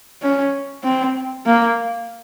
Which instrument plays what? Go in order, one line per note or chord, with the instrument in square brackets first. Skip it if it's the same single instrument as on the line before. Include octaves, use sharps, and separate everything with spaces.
[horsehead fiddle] C#4
C4
A#3